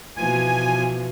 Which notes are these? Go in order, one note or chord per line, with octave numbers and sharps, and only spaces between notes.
B2 E3 F3 G#5